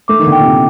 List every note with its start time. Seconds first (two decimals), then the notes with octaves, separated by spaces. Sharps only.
0.08 A3 D6
0.19 D#3
0.27 D3
0.32 G5
0.39 A#2
0.45 C3